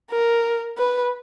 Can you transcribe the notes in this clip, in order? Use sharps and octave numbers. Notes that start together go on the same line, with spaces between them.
A#4
B4